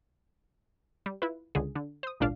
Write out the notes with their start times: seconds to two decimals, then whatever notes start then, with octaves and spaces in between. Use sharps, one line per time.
1.06 G3
1.22 E4 F4 B4
1.55 C#2 D3 G#4
1.76 D3
2.03 C5 D#6
2.20 G#1 C#2 A#2 D4 F5